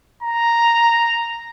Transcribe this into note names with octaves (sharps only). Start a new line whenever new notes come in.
A#5